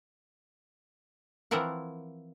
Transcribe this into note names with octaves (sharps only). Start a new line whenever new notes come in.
E3 F3 C4 E4 A#4 F#5